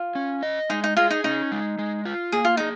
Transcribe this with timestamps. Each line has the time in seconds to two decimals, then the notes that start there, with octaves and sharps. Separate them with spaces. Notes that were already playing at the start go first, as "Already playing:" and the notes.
Already playing: F4
0.15 C#4
0.43 D#5
0.70 G#3 D#4
0.84 D#4
0.97 F4 G#4
1.11 D#4
1.24 C#4 D#4
1.52 G#3
1.79 G#3
2.05 F4
2.32 A#3 G#4
2.45 F4
2.57 D#4 G#4